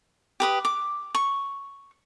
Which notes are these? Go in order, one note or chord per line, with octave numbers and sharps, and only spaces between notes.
G4 B4 D#6
D6
C#6